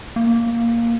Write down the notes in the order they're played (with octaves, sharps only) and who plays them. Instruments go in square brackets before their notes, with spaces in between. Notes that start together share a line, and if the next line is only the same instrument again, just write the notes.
[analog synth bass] A#3